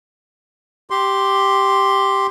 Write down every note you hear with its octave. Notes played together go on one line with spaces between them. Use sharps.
G4 C6